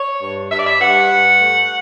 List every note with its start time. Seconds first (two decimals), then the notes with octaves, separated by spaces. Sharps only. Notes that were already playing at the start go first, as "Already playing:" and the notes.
Already playing: C#5
0.21 G2
0.51 G2 E5
0.58 D5
0.66 E5
0.81 G2 F#5
1.11 G2
1.41 A3